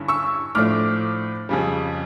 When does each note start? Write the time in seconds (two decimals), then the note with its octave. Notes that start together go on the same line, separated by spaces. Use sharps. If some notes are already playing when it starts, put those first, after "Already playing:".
Already playing: G2 D3 C#4 E4
0.08 C#6 E6
0.55 A2 F3 A3 D4 D6 F6
1.49 F2 C#3 G3